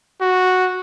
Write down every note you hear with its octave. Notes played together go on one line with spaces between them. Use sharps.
F#4